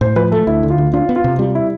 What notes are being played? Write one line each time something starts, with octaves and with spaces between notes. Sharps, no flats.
A2 C5
F3 B4
A3 A4
D2 E4
D3
F4
D2
D4 F4
B3
F4
C3
G3 F4
E4